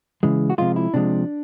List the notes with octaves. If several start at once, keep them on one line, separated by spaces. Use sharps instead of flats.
C#3 E3 G#3
F#4
C3 F3 G#3 F4
E4
C3 F3 G#3 D4